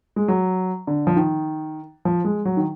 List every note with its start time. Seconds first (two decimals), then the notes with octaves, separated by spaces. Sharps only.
0.16 G#3
0.28 F#3
0.87 D3
1.07 F3
1.16 D#3
2.05 F3
2.25 G#3
2.45 F#3
2.57 D#3